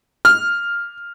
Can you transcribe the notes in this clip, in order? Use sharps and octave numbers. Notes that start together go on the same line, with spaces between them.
F6